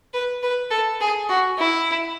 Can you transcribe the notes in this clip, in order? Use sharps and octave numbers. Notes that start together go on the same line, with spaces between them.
B4
B4
A4
G#4
F#4
E4